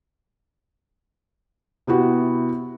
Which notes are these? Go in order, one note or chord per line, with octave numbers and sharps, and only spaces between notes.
C3 B3 E4 F#4